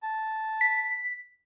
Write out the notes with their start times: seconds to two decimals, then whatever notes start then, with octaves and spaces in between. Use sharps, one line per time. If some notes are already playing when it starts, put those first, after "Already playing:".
0.03 A5
0.61 B6